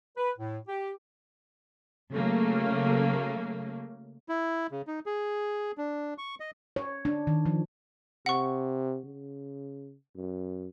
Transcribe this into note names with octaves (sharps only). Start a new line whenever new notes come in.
B4
A2
G4
C#3 F#3 A3 A#3
E4
C#3
D#4
G#4
D4
C#6
D#5
C#5
D4
D#3
F3
C3 F#5 C#6
C#3
F#2